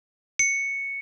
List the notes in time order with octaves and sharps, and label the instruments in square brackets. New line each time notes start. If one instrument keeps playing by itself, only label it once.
[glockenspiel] C#7